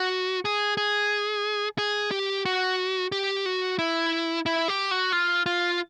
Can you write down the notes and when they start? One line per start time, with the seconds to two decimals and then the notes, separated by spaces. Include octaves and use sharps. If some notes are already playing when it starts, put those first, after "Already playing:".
Already playing: F#4
0.45 G#4
0.77 G#4
1.78 G#4
2.11 G4
2.45 F#4
3.12 G4
3.46 F#4
3.79 E4
4.46 E4
4.68 G4
4.91 F#4
5.12 F4
5.46 F4